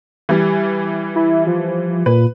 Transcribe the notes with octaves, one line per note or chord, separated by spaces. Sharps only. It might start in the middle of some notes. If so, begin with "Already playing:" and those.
E3 G3
E4
F3
A#2 B4